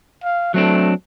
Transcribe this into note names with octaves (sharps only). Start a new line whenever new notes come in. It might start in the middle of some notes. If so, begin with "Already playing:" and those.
F5
F#3 A3 C4 D4